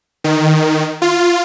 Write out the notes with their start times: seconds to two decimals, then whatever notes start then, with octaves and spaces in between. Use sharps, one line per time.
0.24 D#3
1.02 F4